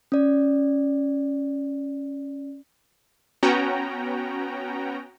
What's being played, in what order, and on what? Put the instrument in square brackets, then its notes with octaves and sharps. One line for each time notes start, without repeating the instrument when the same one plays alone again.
[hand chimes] C#4 D5
[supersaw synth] B3 C#4 F#4 G5 A#5